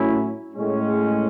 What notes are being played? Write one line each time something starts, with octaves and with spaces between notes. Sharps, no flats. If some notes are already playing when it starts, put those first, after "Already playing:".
Already playing: A2 F#3 C#4 E4
A2 G#3 C#4